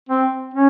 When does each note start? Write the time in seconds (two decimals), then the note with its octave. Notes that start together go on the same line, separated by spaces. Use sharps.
0.09 C4
0.54 C#4